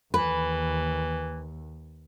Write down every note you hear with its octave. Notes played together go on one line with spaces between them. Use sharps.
D#2 E3 B4